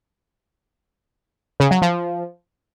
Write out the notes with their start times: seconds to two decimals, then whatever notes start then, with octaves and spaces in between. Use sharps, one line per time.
1.60 C#3
1.71 F#3
1.82 F3